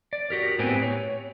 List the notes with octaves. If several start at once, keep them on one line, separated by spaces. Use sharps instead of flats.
D5
F#4 G4 A#4
A2 B3 C4 G4 B4 G#5
C#5